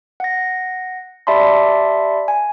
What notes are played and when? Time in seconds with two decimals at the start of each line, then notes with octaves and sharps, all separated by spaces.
0.20 F#5 A#6
1.27 G4 D5 E5 A5 B5 C6
2.28 G#5